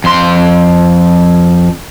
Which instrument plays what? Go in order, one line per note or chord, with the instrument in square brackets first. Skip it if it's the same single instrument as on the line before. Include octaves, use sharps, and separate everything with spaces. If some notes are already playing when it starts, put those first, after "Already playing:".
[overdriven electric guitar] F2 C6